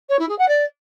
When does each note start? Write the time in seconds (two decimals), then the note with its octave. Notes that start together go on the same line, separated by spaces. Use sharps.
0.09 C#5
0.19 E4
0.29 G#4
0.38 F#5
0.48 D5